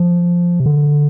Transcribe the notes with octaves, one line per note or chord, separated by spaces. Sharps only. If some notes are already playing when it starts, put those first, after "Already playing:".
Already playing: F3
C3
D3